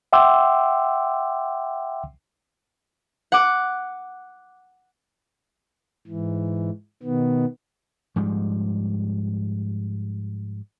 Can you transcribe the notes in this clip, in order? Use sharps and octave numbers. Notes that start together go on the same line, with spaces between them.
E5 F#5 G5 C6 D6 E6
F#5 D6
G#2 E3
B2 D#3 B3
G#2 F3 G3 G#3